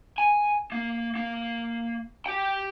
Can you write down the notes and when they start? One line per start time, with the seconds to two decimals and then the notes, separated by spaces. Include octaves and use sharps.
0.18 G#5
0.72 A#3
1.16 A#3
2.26 G4 G5